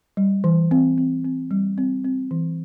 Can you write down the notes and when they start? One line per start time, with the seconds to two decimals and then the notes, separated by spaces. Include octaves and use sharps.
0.17 G3
0.44 E3
0.71 C4
0.98 C4
1.25 C4
1.51 G3
1.78 C4
2.05 C4
2.31 E3